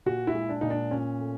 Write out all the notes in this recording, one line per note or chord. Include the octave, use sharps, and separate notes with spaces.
A#2 F#4
E4
G#3
D4
A#2 D#4
D4
A#2 C#4
A3